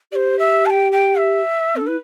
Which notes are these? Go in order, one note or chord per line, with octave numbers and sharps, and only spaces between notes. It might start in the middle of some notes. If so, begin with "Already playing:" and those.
G4 C5 D5
E5
A5
G5
G5
E5
C4 A4
D4
E4 B4